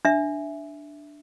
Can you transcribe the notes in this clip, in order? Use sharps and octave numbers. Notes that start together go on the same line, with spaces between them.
D4 E5